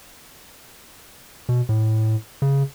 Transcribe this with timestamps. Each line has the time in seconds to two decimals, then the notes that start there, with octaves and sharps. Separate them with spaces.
1.49 B2
1.69 A2
2.42 C#3